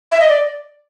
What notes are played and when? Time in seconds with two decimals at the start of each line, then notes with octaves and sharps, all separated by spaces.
0.12 E5
0.20 D#5
0.29 D5